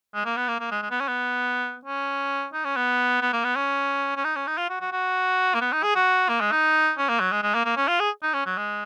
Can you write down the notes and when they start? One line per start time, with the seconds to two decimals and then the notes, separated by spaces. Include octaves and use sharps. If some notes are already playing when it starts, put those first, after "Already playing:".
0.15 G#3
0.25 A#3
0.37 B3
0.48 A#3
0.60 A#3
0.71 G#3
0.82 G#3
0.91 B3
1.00 C#4
1.08 B3
1.85 C#4
2.53 D#4
2.64 C#4
2.76 B3
3.21 B3
3.33 A#3
3.44 B3
3.56 C#4
4.17 C#4
4.24 D#4
4.36 C#4
4.47 D#4
4.58 F4
4.69 F#4
4.81 F#4
4.92 F#4
5.54 A#3
5.61 B3
5.72 D#4
5.83 G#4
5.95 F#4
6.29 A#3
6.40 G#3
6.52 D#4
6.98 C#4
7.09 A#3
7.20 F#3
7.32 G#3
7.43 G#3
7.54 A#3
7.65 A#3
7.77 C#4
7.88 F4
8.00 G#4
8.23 D#4
8.34 C#4
8.46 F#3
8.57 G#3